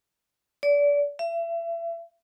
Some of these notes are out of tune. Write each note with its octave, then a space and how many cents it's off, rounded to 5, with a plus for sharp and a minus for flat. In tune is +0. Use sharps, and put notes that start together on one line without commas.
D5 -30
E5 +35